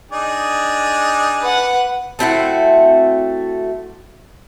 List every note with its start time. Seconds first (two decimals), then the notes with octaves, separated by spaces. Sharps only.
0.11 D4 D#4 G#4
1.41 B4 F#5
2.19 A3 C4 E4 F#4